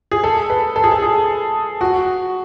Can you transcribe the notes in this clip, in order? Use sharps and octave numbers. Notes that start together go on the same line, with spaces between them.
G#4
A4
B4
A4
G#4
A4
G#4
F#4